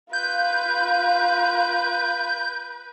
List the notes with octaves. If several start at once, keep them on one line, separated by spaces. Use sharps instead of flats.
F4 B4 F5 G6